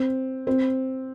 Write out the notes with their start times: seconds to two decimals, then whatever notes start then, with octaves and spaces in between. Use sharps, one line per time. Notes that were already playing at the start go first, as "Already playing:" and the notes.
Already playing: C4
0.47 C4